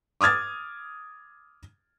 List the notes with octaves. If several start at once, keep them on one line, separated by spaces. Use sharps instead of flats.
D6 D#6 F6 G#6 A6